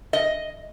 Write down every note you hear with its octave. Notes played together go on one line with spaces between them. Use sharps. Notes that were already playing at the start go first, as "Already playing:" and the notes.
D#5